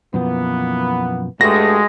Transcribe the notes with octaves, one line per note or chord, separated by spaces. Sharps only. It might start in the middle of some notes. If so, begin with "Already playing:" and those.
F#2 B2 E3 F3 A#3 B3
G2 G#3 A3 F#4 A#6